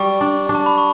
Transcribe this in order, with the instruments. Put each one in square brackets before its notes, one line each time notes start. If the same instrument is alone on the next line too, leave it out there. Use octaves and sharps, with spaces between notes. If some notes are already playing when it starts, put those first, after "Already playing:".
Already playing: [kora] G3 [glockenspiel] C#6
[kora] D4
D4
[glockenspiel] A5
B5
C#6